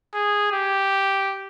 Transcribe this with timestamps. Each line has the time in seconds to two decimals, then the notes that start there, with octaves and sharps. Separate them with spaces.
0.15 G#4
0.52 G4